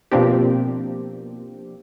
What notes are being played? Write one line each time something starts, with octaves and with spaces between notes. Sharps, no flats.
B2 F3 A#3 C4 D4 G4